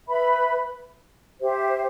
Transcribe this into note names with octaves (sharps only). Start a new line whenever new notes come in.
B4 E5 B5
G4 C5 E5